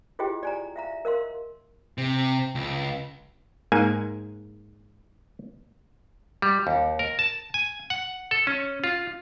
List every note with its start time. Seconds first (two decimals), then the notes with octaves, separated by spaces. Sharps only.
0.19 E4 F4 G4 G#4 D#5 G5
0.43 D5 G#5 A#5
0.76 E5 F5 A#5
1.05 A#4 D#5 F5 C6
1.98 C3
2.55 C#2
3.72 G#2 A#3 G#5
6.42 G3
6.67 D#2
6.99 A#4
7.19 A5
7.54 G#5
7.90 F#5
8.31 A4
8.47 C#4
8.84 F4